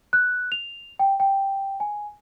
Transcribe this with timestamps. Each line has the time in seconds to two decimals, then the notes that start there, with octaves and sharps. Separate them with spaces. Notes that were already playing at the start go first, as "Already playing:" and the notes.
0.13 F#6
0.52 F7
0.99 G5
1.20 G5
1.80 G#5